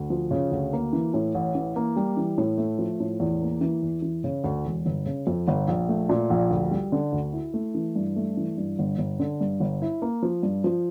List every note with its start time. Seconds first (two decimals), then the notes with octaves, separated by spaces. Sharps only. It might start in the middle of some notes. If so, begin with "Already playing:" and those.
Already playing: D2
0.10 F3
0.31 C#3
0.52 D2
0.73 A#3
0.93 E3
1.14 A2
1.35 A1
1.55 E3
1.76 A#3
1.96 G3
2.17 E3
2.38 A2
2.58 A3
2.79 F3
3.00 A2
3.20 E2
3.42 A#3
3.61 E3
3.83 E2
4.02 E3
4.24 C#3
4.44 D2
4.65 E1
4.85 G1
5.06 C#3
5.27 F2
5.48 G1
5.68 A#1
5.89 A3
6.09 A#2
6.30 A#1
6.51 D2
6.71 G3
6.92 D3
7.12 D2
7.33 E4
7.54 A3
7.75 E3
7.96 G2
8.16 A3
8.37 E3
8.58 G2
8.79 G1
8.98 G1
9.19 D3
9.41 G2
9.60 G1
9.82 E4
10.02 A#3
10.22 F3
10.43 G2
10.64 F3